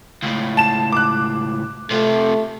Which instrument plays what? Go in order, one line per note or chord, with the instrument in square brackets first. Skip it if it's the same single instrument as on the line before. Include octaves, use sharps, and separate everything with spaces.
[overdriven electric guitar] C#2 A2
[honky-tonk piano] A5 E7
D6 F#6
[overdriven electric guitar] C3 F4 [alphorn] A3